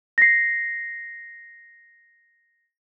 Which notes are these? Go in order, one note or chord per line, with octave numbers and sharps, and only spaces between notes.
A#6 C7